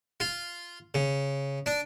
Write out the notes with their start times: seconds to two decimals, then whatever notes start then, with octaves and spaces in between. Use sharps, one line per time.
0.20 F4
0.94 C#3
1.66 D4